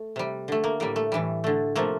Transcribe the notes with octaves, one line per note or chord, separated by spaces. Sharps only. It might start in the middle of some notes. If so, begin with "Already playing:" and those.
Already playing: A3
C3 G3
D3 A3
A#3
A2 G3 A#3
A3
A2 E3 G3
D3 A3
C3 F3 A3 A#3